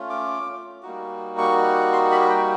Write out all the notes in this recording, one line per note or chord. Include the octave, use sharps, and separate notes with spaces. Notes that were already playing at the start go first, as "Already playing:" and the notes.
Already playing: A3 C#4 F4
D6
G3 A#3 D#4 F#4
C#6
C6
B5
G5